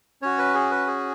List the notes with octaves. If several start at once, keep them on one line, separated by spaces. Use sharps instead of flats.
C#4 F#4 C#5
B4
G#4
B4
G#4